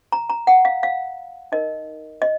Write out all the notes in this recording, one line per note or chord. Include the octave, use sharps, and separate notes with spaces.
A#5
A#5
F#5
F5
F5
D#4 A#4 D#5
D#5